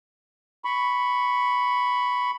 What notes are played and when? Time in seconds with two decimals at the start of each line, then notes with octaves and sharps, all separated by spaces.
0.65 B5 C#6